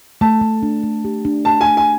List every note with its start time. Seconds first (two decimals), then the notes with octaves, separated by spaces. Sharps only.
0.21 A3 A5
0.41 A3
0.63 D4
0.83 A3
1.05 G4
1.25 D4
1.45 A3 A5
1.61 G#5
1.67 A3
1.77 G#5